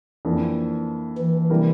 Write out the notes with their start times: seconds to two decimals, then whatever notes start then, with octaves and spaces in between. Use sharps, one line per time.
0.25 F2 E3 A#3 D4
1.18 E3
1.50 C3 G3 A#3 E4 A#4